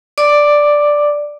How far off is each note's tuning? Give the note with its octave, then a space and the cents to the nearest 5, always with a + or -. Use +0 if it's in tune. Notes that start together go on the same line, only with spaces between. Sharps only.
D5 +0 D6 +5